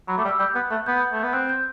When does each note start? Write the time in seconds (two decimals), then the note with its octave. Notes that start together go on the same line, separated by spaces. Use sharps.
0.08 F#3 B5
0.17 A3 D6
0.24 G3
0.29 E6
0.39 G3 G6
0.55 B3 F#6
0.71 A3 F#6
0.86 B3 G6
1.12 A3
1.23 B3
1.33 C4 F#6
1.49 G6